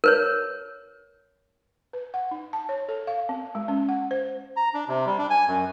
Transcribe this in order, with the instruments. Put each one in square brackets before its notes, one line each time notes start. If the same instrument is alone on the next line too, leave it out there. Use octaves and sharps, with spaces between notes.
[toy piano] A#4 B4 C#5
[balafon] B4
F#5
D#4
A5
C#5
A4
F5
C4
G#3
C#4
F#5
C5
[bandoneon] A#5
D4
C3
G3
D4
G#5
F#2